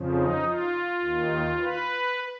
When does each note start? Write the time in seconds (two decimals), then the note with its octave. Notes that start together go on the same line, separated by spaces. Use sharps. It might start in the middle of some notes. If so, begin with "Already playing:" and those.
Already playing: F2 C#3 F3
0.14 D#4
0.43 F4
1.01 D#2 D#3
1.59 B4